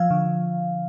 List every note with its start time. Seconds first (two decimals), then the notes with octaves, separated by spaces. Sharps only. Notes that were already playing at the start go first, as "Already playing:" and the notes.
Already playing: F3 F5
0.11 D3